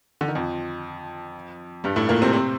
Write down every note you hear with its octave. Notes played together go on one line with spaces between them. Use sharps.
D3
D#3
F2 F3
G2 G3
A2 A3
A#2 A#3
C3 C4
C3 C4